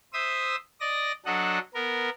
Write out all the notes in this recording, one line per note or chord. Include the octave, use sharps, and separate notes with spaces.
C5 E5 D#6 E6
D5 D#5 A#6
F#3 D4 A4 D#5 F#5
B3 A#4